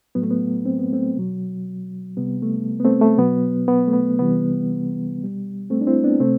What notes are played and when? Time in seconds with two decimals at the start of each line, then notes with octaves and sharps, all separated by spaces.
0.15 A2 F#3 B3
0.22 A3
0.31 B3
0.66 C4
0.79 B3
0.93 A3 C4
1.16 B2 F#3
2.17 C3 G3 B3
2.43 A3
2.80 B3
2.85 A3 C4
3.01 A3
3.17 B2 F#3 B3
3.68 B3
3.88 A3
3.93 B3
4.19 C3 E3 G3 B3
5.20 B2 G3
5.70 A3 C4
5.81 D4
5.87 C4 E4
6.04 B3 D4
6.20 C3 A3 C4